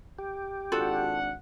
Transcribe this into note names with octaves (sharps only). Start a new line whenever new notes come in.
G4
G#1 D4 F4 F#4 A4 F#5